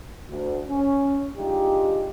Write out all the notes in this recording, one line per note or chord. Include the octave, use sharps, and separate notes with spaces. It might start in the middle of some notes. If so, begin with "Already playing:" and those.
D2
C#4
G#3 D4 D#4 F4 G4